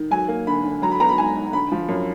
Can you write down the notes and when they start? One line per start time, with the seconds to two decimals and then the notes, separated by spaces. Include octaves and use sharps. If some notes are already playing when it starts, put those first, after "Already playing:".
Already playing: D#3
0.11 F#3 G#5
0.28 A#3
0.47 D3 B5
0.64 D3
0.82 F#3 A#5
0.92 B5
1.00 B3 A#5
1.09 B5
1.18 G#2 G#5
1.36 G#2
1.53 D3 B5
1.72 F3
1.89 F#2